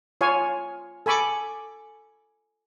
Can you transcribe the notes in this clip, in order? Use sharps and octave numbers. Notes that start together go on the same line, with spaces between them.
F4 C#5 F5 G#5
A4 G#5 B5 C#6 D6